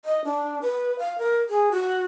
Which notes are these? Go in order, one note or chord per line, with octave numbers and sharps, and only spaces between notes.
D#5
D4
B4
F5
A#4
G#4
F#4